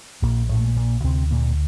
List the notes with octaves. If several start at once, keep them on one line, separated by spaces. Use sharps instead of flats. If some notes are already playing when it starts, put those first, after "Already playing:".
A#1 A#2 A#3
A2 A3
A#2
A#2 A#3
D2 C3 C4
A#2 A#3
D3